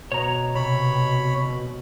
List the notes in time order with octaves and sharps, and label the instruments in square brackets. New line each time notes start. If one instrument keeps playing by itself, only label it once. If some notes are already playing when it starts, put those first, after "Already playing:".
[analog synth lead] B2 [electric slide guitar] C#5 A#5
[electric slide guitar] C3 [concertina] C#5 B5